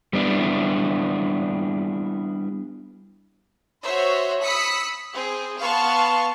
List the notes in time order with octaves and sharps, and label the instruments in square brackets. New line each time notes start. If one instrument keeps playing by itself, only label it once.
[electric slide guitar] G3 B3 D4 E4
[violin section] F#4 C5 C#5 E5
B5 D#6 E6 B6 C#7
C4 G#4
B3 F5 A5 C6 C#6